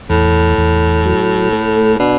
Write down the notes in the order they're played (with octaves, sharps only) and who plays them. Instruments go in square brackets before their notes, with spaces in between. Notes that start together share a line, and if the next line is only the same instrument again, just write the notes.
[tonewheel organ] E2 [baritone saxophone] A2
[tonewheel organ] E2
F#3
A3
[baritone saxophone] B2 [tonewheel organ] D4